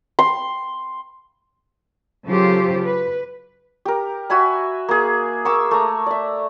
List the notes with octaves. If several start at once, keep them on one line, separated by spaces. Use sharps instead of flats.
C6
C#3 F#3 F4 G4 A4 C5
B4
G4 A#4
F#4 E5 G#5 B5
A#3 G#4
A#3 C#6 D6 E6
A3 A#5
D5 E5